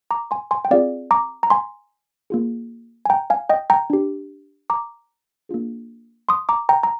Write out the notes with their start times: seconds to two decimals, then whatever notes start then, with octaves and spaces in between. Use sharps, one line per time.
0.11 A#5 D6
0.31 G#5 C6
0.51 G#5 C6
0.65 G5
0.71 C4 F4 G#4 D5 F5
1.11 A#5 D6
1.43 A#5
1.50 G#5 C6
2.30 A#3 F4 G#4
3.05 G#5
3.10 G5 A#5
3.30 F5 G#5
3.49 D#5 G5
3.70 G5 A#5
3.90 D4 G4
4.70 A#5 D6
5.49 A#3 D4 F4 G#4
6.29 C6 D#6
6.49 A#5 D6
6.69 G5 A#5
6.83 A#5